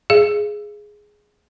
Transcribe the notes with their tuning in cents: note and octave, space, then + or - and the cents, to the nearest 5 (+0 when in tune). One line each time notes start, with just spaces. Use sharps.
G#4 +5 F5 -40